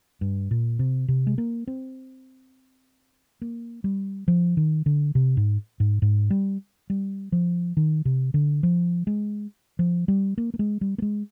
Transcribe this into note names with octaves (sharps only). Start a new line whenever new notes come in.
G2
A#2
C3
C3
G#3
A#3
C4
A#3
G3
F3
D#3
D3
C3
G#2
G#2
G#2
G3
G3
F3
D#3
C3
D3
F3
G#3
F3
G3
A#3
A#3
G#3
G3
A#3
G#3